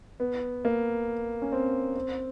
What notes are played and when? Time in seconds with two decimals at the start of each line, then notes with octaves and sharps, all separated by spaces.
0.20 B3
0.65 A#3
1.42 C#4
1.52 C4
1.96 C4